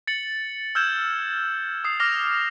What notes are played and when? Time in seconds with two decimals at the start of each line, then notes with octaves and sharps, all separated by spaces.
0.07 A6 C#7 F#7
0.75 E6 F6 G6 G#6 E7
1.85 D#6 C7
2.00 D6 F6 A#6 F7